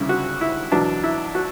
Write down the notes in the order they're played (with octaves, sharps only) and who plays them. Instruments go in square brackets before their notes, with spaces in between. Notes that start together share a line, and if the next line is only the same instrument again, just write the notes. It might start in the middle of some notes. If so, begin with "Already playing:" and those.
Already playing: [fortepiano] D2 C#3 G3 E4
F#4
E4
E2 B2 F#3 D4
E4
F#4